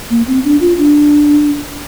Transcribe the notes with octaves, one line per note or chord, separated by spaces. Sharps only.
A#3
C4
D4
F4
D4